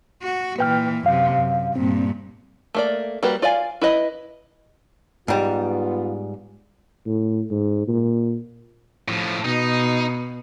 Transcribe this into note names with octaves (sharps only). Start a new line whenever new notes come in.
F#4
A#2 E3 B4 G5 F6
F#2 C3 F5
F#2
G2 A#2 C4
A3 A#3 D5
G3 A#3 F#4 G4 B4
F4 D5 F5 G#5
E4 B4 D#5 B5
G#2 G3 B3 F4
A2
G#2
A#2
A2 F3
B2 D#4